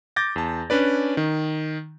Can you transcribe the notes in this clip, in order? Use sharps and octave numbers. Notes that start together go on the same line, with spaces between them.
D6 G6 A6 A#6
E2 A5
C#4 D4 B4 D5
D#3